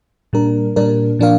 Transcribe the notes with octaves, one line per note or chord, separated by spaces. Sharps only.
A#2 G3 D4 A#4
A#2 G3 D4 A#4
A#2 F3 D4 A#4 F5